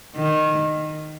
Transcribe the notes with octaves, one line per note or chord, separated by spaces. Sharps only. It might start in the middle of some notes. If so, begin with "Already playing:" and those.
D#3